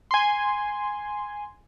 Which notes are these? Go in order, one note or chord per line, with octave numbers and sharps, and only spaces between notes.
G#5 C6